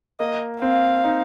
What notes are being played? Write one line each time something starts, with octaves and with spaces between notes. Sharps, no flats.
A#3 D#5
C4 F5
D#4